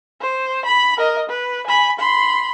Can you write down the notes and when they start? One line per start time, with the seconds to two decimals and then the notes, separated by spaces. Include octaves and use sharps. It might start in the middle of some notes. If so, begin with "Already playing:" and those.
0.21 C5
0.65 B5
0.97 A#4 D#5
1.29 B4
1.67 G#5 B5
1.99 B5 C6